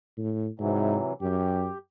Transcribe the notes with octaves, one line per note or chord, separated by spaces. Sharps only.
A2
G#2 C3 E3 F#3
F#2 G4